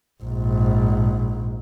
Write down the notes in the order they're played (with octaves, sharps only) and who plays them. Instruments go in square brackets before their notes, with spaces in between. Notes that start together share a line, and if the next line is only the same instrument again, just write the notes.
[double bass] A#1 G#2